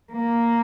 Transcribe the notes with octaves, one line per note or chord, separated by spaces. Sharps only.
A#3